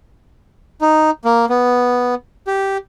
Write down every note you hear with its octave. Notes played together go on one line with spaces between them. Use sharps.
D#4
A#3
B3
G4